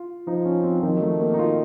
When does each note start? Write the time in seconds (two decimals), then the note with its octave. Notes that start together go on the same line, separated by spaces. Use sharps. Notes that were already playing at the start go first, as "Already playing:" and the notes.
Already playing: F4
0.27 F3 D#4
0.45 C#4
0.64 C4
0.83 D#3 F3
0.93 F#3
1.01 A3
1.20 A#3
1.34 D#4
1.39 F4